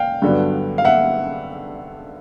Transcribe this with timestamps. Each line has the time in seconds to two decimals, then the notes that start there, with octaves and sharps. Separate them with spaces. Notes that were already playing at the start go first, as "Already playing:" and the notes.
Already playing: F5 G5
0.22 G2 D3 F#3 B3
0.78 F5
0.85 E5 F#5